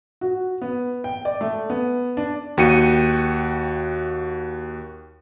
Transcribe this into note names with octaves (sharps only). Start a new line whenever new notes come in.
F#4
B3
G5
D5
A3
B3
D4
D#2 F#4 G5 C#7 D#7